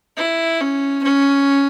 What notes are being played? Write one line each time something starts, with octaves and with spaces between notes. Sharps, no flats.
E4
C#4
C#4